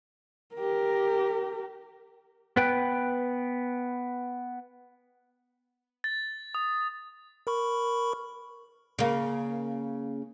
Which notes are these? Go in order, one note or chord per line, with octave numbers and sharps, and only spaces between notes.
G4 A#4
B3 B4 G5
A6
D#6
A#4 B5 C#6
C#3 A#3